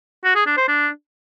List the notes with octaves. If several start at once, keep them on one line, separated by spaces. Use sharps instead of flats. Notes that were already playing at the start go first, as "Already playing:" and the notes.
F#4
G#4
D4
C5
D4